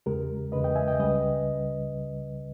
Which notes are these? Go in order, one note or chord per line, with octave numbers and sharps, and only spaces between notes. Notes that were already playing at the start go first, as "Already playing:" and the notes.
E2 C#3 G#3 G4 A#4
E2 C#3 G#3 B4 D#5
D#5 G5
E5 G#5
D#5 G5
C#2 C#3 G3 B4 D#5